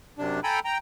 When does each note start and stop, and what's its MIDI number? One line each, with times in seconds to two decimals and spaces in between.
0.18 0.40 42
0.18 0.40 48
0.18 0.40 62
0.44 0.60 69
0.44 0.60 79
0.44 0.60 80
0.44 0.60 82
0.44 0.60 83
0.65 0.78 79
0.65 0.78 82